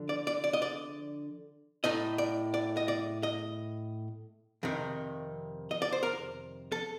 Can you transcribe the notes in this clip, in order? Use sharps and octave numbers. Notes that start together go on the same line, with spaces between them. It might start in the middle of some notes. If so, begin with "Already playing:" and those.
Already playing: D3 F3
D5
D5
D5
D#5
D5
A2 A3 D#4 D#5
D5
D5
D#5
D5
D#5
F2 C3 D#3
D#5
D5
C5
A#4
A4